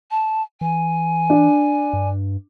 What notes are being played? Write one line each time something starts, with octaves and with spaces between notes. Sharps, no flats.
A5
E3 G#5
D4
G2